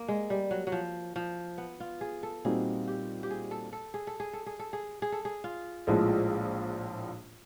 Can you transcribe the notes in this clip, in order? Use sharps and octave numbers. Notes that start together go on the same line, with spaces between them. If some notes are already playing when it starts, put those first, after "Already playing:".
Already playing: A#3
G#3
G3
F#3
F#3
F3
F3
B3
F4
G#4
A4
A#2 G3 C4 D#4 F#4 G#4
G4
G4
G#4
A4
A4
G#4
A4
G#4
A4
G#4
A4
G#4
G#4
A4
G#4
F4
A#1 A2 F3 G#3